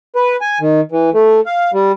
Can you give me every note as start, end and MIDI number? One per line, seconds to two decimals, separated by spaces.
0.16 0.36 71
0.41 0.59 80
0.61 0.81 51
0.92 1.10 52
1.14 1.40 57
1.46 1.71 77
1.73 1.92 55